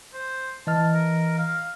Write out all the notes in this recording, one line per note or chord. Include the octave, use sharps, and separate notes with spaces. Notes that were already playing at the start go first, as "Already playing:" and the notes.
C5
E3 D#5 A5 F6
A#4
F5